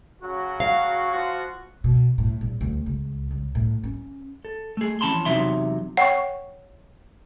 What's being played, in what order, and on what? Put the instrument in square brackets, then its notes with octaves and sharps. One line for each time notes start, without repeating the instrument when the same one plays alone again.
[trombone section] C#3 F#3 F#4
[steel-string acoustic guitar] F5
[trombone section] F3 F4 F#4
[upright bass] B2
A2
A#1
D2
C#2
C#2
A2
C#4
[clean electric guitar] A4
A3 G#4
F2 E3 C#4 A5 B5 C6
E2 C3 F#3 D#4 E5 C6
[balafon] C#5 G5 C#6 [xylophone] F#5